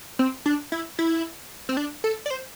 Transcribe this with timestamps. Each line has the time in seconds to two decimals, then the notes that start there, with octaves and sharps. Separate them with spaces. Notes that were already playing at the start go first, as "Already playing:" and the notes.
0.19 C4
0.46 D4
0.72 E4
0.99 E4
1.69 C4
1.77 D4
2.04 A4
2.26 D5
2.30 C5